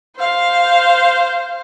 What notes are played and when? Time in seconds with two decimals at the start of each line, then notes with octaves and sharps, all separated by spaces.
0.17 C5 F5